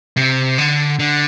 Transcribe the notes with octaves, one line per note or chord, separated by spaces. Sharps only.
C3
D3
D3